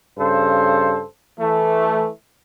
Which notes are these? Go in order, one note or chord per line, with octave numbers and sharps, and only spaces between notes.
G2 C#3 A4 C5
E3 A3